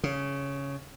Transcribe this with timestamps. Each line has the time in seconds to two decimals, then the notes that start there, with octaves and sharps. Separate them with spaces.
0.04 C#3